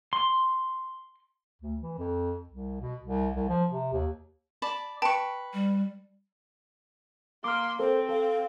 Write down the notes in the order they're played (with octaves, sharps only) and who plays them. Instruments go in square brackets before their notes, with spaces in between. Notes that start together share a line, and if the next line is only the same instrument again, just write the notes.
[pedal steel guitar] C6
[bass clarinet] D2
E3
F2
C2
B2
C2
C2
F3
C3
D#2
[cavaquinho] D5 A5 B5
[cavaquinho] B4 C#6 [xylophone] G5 A5
[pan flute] G3
[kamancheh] A#3 C6 [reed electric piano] D6 F6
[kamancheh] C4 [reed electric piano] A4 A#4 [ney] C5
[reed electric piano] A4 [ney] F5